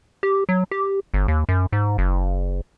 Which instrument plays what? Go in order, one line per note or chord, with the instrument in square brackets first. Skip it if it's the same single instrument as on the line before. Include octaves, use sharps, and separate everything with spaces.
[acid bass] G4
F#3
G4
G1
D#2
F#2
G#2
F#1